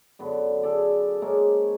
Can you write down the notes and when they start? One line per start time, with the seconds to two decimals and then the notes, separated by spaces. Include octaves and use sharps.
0.19 F#2 D3 B3
0.63 G#4 A4 D5
1.22 G#3 A#3 C#4 C5